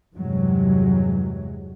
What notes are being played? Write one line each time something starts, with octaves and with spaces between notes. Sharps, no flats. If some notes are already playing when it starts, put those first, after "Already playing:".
E2 G2 C3 E3 F#3 G#3